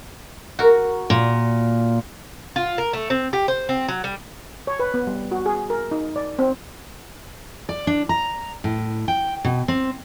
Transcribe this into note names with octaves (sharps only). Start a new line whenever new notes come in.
F#4 A#4
A#2
F4
A#4
A3
C4
G4
C5
C4
F#3
G3
C#5
B4
B3
G3
F#4
G#4
A#4
D#4
D5
C4
D5
D4
A#5
A2
G5
B2
C4